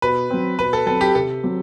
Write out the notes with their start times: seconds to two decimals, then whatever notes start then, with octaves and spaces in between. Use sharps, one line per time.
0.02 B2 B4
0.30 F#3 C4
0.59 B2 B4
0.73 A4
0.86 F#3 C4 A4
1.01 G4
1.15 C3 A4
1.43 F#3 C4 G4